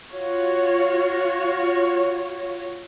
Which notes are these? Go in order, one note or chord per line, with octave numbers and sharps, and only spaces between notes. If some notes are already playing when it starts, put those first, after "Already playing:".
F4 F#4 C#5